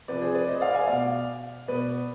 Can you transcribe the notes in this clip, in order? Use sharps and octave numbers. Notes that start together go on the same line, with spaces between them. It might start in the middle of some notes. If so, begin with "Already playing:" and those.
C3 F3 B4 D5
G#4 C5
B4 D5
C5 D#5
D5 F5
F5 G#5
B2 D5 F5
B2 B4 D5